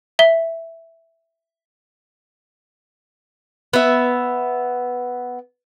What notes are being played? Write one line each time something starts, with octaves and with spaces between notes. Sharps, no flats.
E5 G7
B3 E5